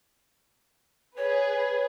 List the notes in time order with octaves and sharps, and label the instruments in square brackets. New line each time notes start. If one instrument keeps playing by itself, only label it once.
[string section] G#4 B4 [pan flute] C#5